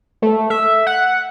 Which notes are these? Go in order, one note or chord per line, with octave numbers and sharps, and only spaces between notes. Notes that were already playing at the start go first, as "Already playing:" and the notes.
A3
E5
F#5